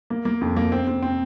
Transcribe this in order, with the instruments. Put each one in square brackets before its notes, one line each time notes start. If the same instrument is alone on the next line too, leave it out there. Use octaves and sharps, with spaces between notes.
[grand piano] A#3
A#3
F2
A#3
C4
C4
C4